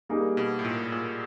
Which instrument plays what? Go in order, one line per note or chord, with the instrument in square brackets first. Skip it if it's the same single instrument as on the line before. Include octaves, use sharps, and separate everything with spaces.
[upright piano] G3 A#3 D#4 G#4
[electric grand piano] B2
A2
A#2
A#2